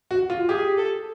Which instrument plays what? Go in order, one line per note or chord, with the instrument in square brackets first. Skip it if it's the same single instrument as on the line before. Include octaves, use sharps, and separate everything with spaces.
[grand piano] F#4
F4
[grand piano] G4 [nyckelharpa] G#4
[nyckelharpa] A4